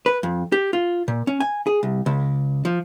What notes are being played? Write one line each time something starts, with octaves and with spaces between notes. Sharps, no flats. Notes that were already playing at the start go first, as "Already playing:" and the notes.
B4
F2
G4
F4
A#2
C#4
G#5
G#4
C2
C#2
F3